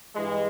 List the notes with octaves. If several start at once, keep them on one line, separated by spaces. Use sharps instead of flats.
G2 E3 G#3